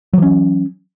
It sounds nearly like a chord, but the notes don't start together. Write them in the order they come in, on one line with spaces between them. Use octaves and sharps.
F#3 E3 C#4